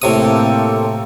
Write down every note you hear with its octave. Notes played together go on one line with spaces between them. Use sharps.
A2 C3 A#3 C4 A4 D#6